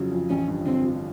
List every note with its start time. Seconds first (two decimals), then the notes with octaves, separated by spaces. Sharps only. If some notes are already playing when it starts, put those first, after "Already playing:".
Already playing: F2 C#3 F#3
0.12 F2
0.29 A1 C#4
0.48 G2
0.66 D3 C4
0.85 F3